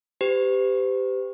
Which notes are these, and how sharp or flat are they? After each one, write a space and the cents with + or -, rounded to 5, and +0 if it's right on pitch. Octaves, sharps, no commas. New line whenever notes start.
G4 +0 C5 -45